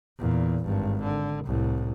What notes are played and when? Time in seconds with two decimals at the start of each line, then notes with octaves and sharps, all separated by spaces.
0.19 E2 A#2
0.66 G#1 G2
1.04 D3
1.45 C2 A2